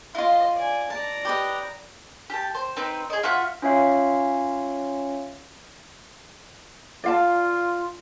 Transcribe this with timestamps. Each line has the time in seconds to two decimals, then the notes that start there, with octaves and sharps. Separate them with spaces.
0.15 E4 F4 D#5 C6
0.55 D5 G#5
0.90 D5 A5 A#5
1.25 G4 B4 D#5
2.30 G4 A5
2.54 C5
2.77 C4 D#4 B4
3.10 G#4 D#5
3.23 F4 F#4 E5 F#5
3.62 C#4 F4 C#5 E5 F5
7.04 F4 D5 F5 A5